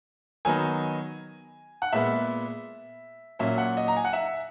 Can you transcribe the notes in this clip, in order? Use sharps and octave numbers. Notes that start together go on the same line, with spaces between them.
D#3 F#3 B3 D#4 G#5
F#5
A#2 G#3 B3 E5
A#2 F#3 C#4 E5
F#5
D#5
A#5
G#5
F#5
E5